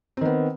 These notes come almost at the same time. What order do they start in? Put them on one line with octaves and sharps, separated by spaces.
C4 D#3 B3